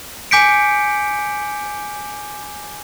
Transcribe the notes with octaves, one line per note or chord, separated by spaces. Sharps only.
G#5 D6 G6 B6 C#7 D7